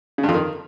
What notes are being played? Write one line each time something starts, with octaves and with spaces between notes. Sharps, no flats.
C#3
G2
F2
D#3